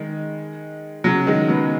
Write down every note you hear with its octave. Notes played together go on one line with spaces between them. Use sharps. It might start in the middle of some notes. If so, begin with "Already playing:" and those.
Already playing: D#3 G#3
C#3 F#3
D#3 G#3
F#3 B3